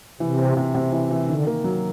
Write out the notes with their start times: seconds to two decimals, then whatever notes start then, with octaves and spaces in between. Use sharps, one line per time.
0.20 C3 E3
0.39 C4
0.57 C3
0.75 C3
0.92 E3
1.11 E3
1.28 D3 D#3
1.47 A#3
1.64 F#3